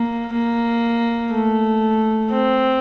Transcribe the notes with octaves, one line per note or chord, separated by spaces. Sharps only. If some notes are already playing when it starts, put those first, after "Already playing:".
Already playing: A#3
A#3
A3
C4